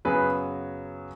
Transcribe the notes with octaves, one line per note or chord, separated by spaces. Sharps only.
F#2 C#3 F#3 B3 G#4 B4